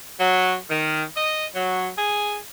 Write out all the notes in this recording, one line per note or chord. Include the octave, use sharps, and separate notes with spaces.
F#3
D#3
D#5
F#3
G#4